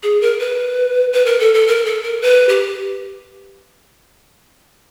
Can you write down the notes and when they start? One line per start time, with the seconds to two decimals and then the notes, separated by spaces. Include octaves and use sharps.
0.03 G#4
0.21 A#4
0.39 B4
1.13 B4
1.26 A#4
1.40 A4
1.54 A4
1.67 A#4
1.86 A4
2.03 A#4
2.22 B4
2.49 G4